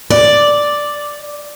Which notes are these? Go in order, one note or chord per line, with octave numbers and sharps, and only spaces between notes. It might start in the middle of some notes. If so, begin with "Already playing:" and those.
D5